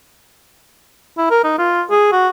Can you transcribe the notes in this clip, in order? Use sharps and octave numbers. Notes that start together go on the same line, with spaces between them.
E4
A#4
D#4
F4
G#4
F#4